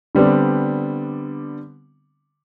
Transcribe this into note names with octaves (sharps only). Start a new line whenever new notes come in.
D3 G3 B3 C4 D4